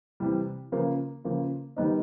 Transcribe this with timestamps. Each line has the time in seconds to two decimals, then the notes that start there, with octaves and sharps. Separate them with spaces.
0.20 C3 E3 G3
0.72 C#3 F3 A#3
1.25 C#3 F3 A#3
1.77 D#3 G3 B3 D#4